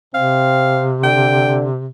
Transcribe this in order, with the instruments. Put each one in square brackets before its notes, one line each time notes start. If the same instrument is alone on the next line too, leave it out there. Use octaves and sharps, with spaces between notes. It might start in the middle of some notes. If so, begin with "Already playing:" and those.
[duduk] C3 [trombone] C4 [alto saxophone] F5
[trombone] D3 [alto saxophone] G5